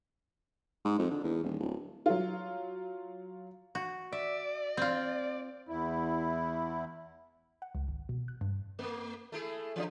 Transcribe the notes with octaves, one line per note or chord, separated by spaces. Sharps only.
G#2
F2
D3
E2
D#1
D1
F#3 F4
F#4
D5 E5
C4 F4
E2 E4
F#5
C#2
G#1
B2
F#6
G2
A3 A#3
A3 E4 G#4
E3 C#4 D4